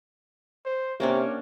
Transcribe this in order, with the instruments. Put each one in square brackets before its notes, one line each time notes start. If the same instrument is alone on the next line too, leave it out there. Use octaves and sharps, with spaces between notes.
[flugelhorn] C5
[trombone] C3 [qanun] A#3 C#4 D4 [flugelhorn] C#5